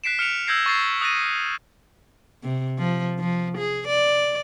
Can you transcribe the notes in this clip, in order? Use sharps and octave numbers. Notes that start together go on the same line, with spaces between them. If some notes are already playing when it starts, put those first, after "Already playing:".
F#6 B6 C7 D7 E7
F6 C#7 D7 F7
E6 G6 G#6 A#6 C7 D7
C#6 A6 C7
D#6 F#6 A6 A#6 D#7
C3
F3
F3
G#4
D5